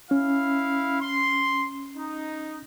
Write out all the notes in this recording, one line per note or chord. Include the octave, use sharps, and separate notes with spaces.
C#4 E4 F5
C6
D#4